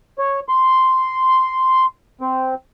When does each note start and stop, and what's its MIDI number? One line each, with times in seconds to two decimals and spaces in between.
0.19 0.40 73
0.49 1.86 84
2.21 2.54 60